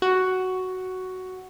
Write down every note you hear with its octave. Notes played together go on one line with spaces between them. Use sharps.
F#4